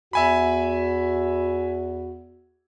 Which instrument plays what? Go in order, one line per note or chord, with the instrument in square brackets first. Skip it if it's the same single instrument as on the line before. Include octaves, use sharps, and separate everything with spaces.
[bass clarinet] E2 [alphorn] F#4 [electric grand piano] E5 G#5 B5